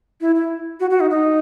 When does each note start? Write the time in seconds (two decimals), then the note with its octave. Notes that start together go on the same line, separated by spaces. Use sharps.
0.21 E4
0.35 E4
0.80 F#4
0.90 F#4
1.00 D#4
1.10 D#4